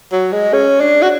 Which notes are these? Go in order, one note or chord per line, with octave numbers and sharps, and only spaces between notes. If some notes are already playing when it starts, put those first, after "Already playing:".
F#3
G#3
C#4
D4
F#4